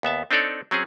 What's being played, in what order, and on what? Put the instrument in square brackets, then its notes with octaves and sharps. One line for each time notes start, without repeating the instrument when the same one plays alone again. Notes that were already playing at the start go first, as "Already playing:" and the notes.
[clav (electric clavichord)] D#2 B3 E5 A5
C4 D4 D#4 A4 C#5 D5
F#3 C4 C#4 G#4